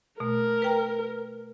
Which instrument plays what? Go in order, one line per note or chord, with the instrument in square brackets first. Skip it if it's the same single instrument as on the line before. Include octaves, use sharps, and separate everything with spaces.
[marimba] B2 A3 [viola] A#4
[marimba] B4 G5 A#5